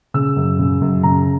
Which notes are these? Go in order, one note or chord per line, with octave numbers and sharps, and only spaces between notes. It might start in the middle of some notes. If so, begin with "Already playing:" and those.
C#3 E6
F#2
C#3
F#2
C#3 A#5